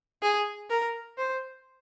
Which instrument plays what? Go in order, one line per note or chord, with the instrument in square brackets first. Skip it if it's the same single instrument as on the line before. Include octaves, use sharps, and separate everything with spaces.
[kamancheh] G#4
A#4
C5